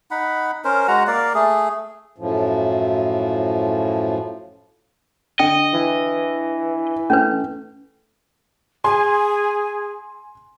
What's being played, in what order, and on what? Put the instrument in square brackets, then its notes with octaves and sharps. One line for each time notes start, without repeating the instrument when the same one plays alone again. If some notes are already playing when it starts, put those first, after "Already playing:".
[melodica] D#4 F#5 B5
C#4 A#4 C5
G#3 F#4 F#5 A#5
A#3 A#4 D5 F5
A3 G#4
[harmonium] F#2 A2 F3
[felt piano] D3 [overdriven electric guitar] D#5 [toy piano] G5
[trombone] E3
[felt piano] A3 [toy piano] C#4 D4 B4
[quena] G#4 [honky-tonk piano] G#5 C6